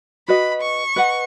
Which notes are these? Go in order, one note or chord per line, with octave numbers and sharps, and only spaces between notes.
F#4 B4 D#5 B5
C#6
B4 D#5 F#5